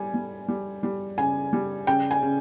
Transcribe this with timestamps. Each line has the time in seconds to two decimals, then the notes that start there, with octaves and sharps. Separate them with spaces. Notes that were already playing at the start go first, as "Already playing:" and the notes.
Already playing: G3 G#5
0.14 G3
0.48 G3
0.83 G3
1.18 C#3 G#5
1.53 G3
1.87 C#3 G5
2.11 G#5
2.23 C#3